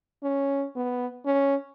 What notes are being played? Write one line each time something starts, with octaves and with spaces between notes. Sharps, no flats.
C#4
B3
C#4